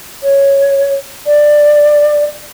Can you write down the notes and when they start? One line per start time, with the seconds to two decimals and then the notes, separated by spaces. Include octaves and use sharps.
0.23 C#5
1.26 D5